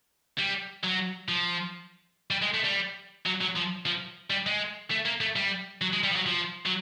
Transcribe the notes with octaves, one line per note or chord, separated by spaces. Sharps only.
G3
F#3
F3
G3
G#3
A3
G3
F#3
F#3
F3
F3
G3
G#3
A3
A#3
A3
G3
F#3
G#3
G3
F3
F#3
F3
F#3